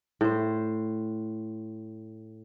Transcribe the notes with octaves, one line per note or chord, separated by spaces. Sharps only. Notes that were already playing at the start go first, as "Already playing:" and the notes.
A2 C5